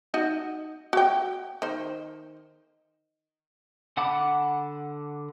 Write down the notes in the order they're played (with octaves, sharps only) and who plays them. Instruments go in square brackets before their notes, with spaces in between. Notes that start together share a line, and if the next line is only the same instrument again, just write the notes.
[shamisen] D#4 F#4 D#5
F#4 G5
D#3 C5
[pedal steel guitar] D3 F#5 A5 B5 D6